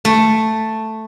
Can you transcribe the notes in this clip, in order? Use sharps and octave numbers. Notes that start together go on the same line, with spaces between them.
A3